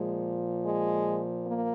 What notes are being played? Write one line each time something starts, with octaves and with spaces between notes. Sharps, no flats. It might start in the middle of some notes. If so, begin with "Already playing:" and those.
Already playing: A#2 F3 G#3
G#3
A#3